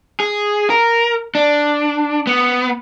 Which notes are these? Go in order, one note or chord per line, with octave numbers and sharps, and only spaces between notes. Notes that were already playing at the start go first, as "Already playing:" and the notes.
G#4
A#4
D4
B3